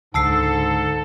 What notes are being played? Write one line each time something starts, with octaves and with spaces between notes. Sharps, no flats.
C#2 G#2 D3 G#3 A4 A5 E6 C7